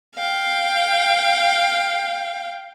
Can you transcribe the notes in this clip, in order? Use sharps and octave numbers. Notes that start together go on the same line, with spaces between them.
F5 G5